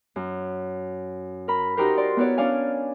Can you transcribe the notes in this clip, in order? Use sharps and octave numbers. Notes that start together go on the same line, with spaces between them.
F#2
A#4 B5
D#4 F#4 G4 A#4 C5
D5 C6
B3 E4 F#4 C#5 D5
C#4 D4 D5 F5 G#5